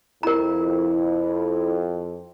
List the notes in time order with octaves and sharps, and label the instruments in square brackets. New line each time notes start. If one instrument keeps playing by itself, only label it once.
[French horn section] F2 [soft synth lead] E4 [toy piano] A#4 A#5